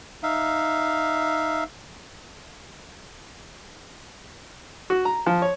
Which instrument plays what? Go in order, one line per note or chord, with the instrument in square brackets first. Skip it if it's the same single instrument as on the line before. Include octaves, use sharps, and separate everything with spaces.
[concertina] D#4 E5 F5
[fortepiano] F#4
A#5
F3
C#5